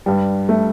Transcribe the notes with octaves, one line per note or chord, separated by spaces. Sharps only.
G2 G3
A3